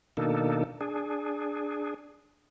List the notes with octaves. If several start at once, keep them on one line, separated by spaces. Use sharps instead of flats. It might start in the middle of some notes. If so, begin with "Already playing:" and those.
B2 D#3 A#3 D4 D#4 A4
D4 G#4